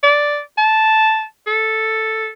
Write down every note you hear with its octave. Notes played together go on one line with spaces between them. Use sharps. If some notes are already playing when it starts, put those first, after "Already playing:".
D5
A5
A4